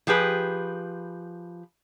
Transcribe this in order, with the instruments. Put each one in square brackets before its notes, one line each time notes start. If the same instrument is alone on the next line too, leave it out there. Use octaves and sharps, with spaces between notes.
[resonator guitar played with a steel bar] F3 G4 G#4 B4